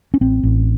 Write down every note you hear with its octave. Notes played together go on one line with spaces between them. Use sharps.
C#4
A1 C4
A1